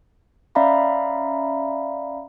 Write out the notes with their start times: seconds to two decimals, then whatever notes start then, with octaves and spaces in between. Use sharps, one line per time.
0.55 C#4 D5 E5 F5 A#5 B5